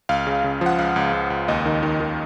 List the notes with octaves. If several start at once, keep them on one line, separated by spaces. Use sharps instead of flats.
C#2 F5
C#3
C#3
F3 F#5
C#2 F5
C#2
C#2
C#2
D#2 D#5
D#3
D#3
D#3